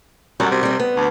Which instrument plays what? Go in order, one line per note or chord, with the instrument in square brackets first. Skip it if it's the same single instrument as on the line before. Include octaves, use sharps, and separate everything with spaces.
[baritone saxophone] F#2 [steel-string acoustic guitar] G3 F#4
[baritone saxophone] C3
[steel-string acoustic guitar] G3 C4
B3
[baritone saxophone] D2